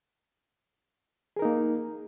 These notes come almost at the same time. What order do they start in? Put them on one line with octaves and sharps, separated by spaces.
G#4 A#4 D#4 A#3